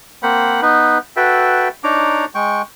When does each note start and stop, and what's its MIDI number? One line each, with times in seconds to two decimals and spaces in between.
0.23 0.61 58
0.23 0.61 60
0.23 0.61 72
0.23 0.61 78
0.23 0.61 83
0.62 0.98 59
0.62 0.98 63
0.62 0.98 71
1.17 1.69 66
1.17 1.69 69
1.17 1.69 71
1.17 1.69 76
1.17 1.69 79
1.84 2.25 62
1.84 2.25 63
1.84 2.25 73
1.84 2.25 82
1.84 2.25 86
2.35 2.62 56
2.35 2.62 79
2.35 2.62 85